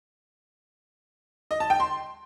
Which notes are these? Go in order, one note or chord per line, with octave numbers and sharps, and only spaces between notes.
D#5
A5
G5
C6